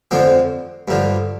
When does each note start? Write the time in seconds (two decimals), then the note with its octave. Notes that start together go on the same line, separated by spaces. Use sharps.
0.11 F2 D3 F3 C4
0.88 G2 D3 F3